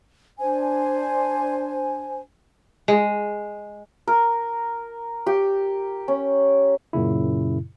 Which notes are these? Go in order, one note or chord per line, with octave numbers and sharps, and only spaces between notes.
D4 C5 G#5
G#3
A#4
G4
C#4
F#2 A#2 C#3 E4